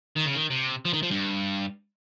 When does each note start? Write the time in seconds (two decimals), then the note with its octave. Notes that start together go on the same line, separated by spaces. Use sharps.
0.16 D#3
0.26 C#3
0.35 D#3
0.50 C3
0.85 F3
0.93 D#3
1.03 F3
1.11 G2